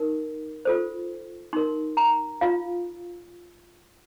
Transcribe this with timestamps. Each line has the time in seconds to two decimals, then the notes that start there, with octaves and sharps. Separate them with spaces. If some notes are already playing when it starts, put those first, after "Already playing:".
Already playing: D#4 A#4
0.65 F4 A4 C5
1.53 D#4 A#4 C6
1.97 A#5
2.41 F4 F5